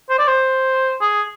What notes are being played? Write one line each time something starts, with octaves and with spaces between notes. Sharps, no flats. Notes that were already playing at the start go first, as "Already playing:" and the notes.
C5
D5
C5
G#4